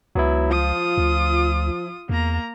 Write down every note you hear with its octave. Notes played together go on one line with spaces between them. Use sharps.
C#2 F#3 B3 E4
F3 F4 D#6
D2
E2 A#3 A#5